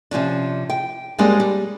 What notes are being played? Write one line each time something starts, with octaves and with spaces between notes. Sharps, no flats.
C3 F3 C#4 D4
G5
F#2 G3 G#3 A#3 C4 D4
G3